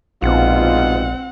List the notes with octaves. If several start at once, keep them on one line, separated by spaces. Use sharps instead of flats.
A#1 G#2 B2 C4 F4 F#5